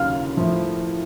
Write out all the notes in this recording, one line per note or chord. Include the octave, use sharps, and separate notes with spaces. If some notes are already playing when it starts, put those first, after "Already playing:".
Already playing: D#2 C#3 F#3 F5 F6
A2 F3